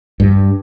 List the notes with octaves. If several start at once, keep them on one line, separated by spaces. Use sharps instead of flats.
G2